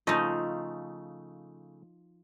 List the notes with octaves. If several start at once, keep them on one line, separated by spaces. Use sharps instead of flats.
C#3 F3 A3 D#4 D#5